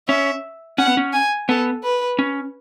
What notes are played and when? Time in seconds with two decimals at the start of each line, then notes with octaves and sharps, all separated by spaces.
0.08 C#4 E5
0.78 C#4 F#5
0.87 B3
0.97 C#4
1.13 G#5
1.49 B3 A4
1.84 B4
2.19 C#4